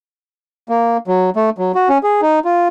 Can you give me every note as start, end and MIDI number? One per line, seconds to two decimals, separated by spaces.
0.69 0.97 58
1.07 1.30 54
1.36 1.50 57
1.58 1.72 54
1.75 1.89 66
1.89 1.98 61
2.03 2.21 68
2.22 2.39 63
2.45 2.68 65